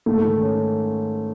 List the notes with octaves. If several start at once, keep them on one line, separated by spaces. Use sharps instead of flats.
G#2 A3
D#3
C#4